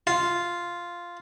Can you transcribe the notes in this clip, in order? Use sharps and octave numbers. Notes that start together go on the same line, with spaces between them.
F4